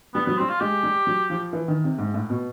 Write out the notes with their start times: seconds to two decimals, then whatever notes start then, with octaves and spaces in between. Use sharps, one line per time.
0.14 G3 B3
0.26 F#3 B3
0.38 G3 C4
0.49 F4
0.61 G#3 G4
0.83 G3
1.07 F#3
1.30 F3
1.53 E3
1.68 D#3
1.84 C3
1.98 G#2
2.14 A2
2.30 B2